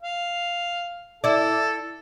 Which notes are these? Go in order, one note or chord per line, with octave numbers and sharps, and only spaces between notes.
F5
E4 A4 D5